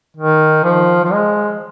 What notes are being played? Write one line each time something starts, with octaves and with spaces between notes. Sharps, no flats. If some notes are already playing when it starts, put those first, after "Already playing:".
D#3
F3
F3
G#3